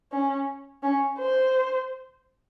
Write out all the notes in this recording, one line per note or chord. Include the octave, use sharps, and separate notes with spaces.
C#4
C#4
C5